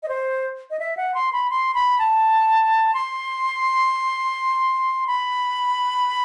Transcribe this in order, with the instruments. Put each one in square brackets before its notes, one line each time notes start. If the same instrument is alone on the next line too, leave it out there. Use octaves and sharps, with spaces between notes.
[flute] D#5
C5
D#5
E5
F#5
C6
B5
C6
B5
A5
C6
B5